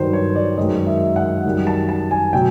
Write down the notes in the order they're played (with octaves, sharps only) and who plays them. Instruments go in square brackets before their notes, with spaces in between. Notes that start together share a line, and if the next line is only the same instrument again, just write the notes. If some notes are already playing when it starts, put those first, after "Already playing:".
Already playing: [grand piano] G2 D#3 F#3 C5
C#5
D5
F#2 D#3 G#3 D#5
E5
F#5
F#2 D#3 G3
A5
A5
G#5
B2 F#3 G5